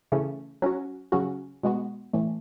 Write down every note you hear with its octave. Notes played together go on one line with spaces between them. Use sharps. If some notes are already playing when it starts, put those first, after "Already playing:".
C#3 E3 A3 C#4
F#3 C#4 F#4
C#3 F#3 C#4 F#4
B2 G#3 B3 F#4
A2 E3 A3